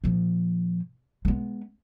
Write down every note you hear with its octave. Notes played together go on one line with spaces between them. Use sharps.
A#2 F3
G#3 B3